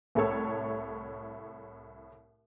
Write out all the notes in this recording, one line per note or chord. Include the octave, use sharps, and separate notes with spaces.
C2 A2 A4 C#5 E6